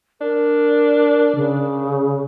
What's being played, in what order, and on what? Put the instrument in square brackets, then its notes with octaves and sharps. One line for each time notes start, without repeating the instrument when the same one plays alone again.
[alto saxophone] D4 [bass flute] A#4
[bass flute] C#3